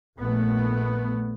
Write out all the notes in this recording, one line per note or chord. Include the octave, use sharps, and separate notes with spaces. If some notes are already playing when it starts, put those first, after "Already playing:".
A#1 A3 B3